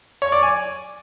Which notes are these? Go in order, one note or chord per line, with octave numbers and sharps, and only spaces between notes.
C#5
D5
G#5